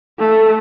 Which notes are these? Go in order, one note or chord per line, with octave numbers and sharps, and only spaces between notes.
A3